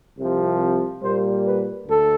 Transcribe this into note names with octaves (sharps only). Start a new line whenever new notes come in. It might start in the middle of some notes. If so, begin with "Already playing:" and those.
C2 C3 F3
A#2 G3 A#3 C5
B4
D2 A4